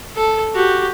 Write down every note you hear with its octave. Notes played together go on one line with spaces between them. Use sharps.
A4
F#4 G4